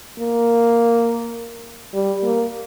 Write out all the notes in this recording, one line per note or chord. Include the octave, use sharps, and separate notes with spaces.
A#3
G3
A#3